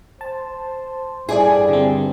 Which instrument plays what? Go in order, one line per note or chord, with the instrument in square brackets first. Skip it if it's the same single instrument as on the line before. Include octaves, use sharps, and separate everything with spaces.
[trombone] C5 [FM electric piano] A5
[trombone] G2 [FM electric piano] E4 A4 [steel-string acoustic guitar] G#4 D5 G#5
[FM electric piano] D3 G3 C4